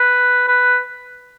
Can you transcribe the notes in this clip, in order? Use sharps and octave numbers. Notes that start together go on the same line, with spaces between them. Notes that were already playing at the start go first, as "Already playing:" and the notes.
Already playing: B4
B4